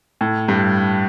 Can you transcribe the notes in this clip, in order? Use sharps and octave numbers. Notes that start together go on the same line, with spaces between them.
A2
G2